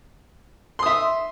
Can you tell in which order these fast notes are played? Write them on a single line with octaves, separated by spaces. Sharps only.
C6 D#6 E5